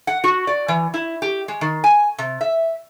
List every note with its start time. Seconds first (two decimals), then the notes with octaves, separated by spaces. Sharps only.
0.07 F#5
0.24 F#4
0.47 D5
0.68 E3
0.94 E4
1.22 G4
1.48 G#3
1.61 D#3
1.84 G#5
2.18 C3
2.41 E5